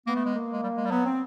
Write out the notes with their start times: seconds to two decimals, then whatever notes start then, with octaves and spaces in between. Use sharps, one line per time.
0.07 A#3 B3
0.16 A3
0.25 G#3
0.35 A#3
0.52 G#3
0.63 G3
0.77 G#3
0.85 G3
0.91 F#3 B3
1.05 C4